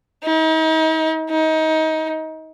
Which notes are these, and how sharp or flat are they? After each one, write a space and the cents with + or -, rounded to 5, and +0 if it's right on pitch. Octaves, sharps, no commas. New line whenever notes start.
D#4 +40
D#4 +25